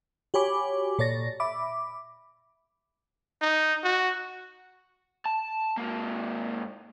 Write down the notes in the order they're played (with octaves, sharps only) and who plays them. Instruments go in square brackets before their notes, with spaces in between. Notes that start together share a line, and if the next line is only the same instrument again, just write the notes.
[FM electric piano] F#4 G4 C#5 G#5 B5 D6
A#2 A4 C#5 D5 A6 A#6
E5 B5 D6
[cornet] D#4
F#4
[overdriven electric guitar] A5
G#2 A#3